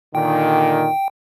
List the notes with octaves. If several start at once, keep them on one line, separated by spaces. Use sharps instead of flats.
A#2 D3 D#3 G5